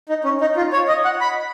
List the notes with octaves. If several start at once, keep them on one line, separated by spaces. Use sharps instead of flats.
D#4
C#4
D#4
F4
C#5
D#5
F#5
B5